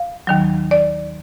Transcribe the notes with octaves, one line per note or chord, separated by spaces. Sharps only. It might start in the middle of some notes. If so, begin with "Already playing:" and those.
Already playing: F5
D#2 D#3 F#3
D5